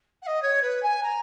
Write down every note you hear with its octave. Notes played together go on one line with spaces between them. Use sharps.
F#5
D#5
C#5
B4
G#5
A#5